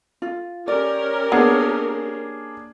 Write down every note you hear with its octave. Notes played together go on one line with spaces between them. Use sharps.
F4
C#4 G4 A#4 D5
A#3 B3 D4 G#4